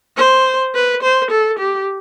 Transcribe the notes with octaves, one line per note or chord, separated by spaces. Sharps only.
C5
B4
C5
A4
G4